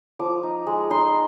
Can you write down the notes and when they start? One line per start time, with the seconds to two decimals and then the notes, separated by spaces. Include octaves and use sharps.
0.19 F3 D6
0.43 D#4
0.67 G#3
0.90 D#4 C6